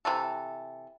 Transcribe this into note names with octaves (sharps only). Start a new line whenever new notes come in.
C3 E3 A4